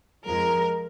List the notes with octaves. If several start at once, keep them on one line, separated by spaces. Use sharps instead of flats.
F2 F3 G#3 A#4